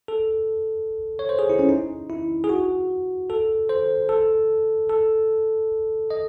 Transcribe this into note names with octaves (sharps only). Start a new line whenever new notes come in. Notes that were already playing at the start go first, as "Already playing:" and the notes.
A4
C#5
C5
G#4
E4
C#4
D#4
E4
G#4
F#4
A4
C5
A4
A4
D#5